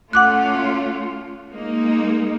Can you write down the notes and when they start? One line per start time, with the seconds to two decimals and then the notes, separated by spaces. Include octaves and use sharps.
0.13 A3 C#4 F4 F#5 D6 F#6
1.50 G#3 A#3 D#4